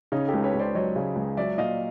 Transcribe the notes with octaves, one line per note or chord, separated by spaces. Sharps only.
C#3 C#4 D#4
G4 A4
C#2
B4 C#5
C#2
C5 D5
F#3 C#5 D#5
C#3
C#2
F#3 D5 E5
A#2 D#5 F5